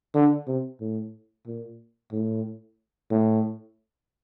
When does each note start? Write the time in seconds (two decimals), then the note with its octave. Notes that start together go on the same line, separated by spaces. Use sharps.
0.15 D3
0.47 C3
0.81 A2
1.47 A#2
2.12 A2
3.11 A2